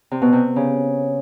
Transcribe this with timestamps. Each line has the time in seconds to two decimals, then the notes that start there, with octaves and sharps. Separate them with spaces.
0.11 C3
0.22 B2
0.33 C3
0.56 C#3